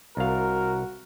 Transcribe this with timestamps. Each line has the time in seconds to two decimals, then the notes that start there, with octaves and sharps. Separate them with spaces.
0.17 C2 F#4 A#4 F5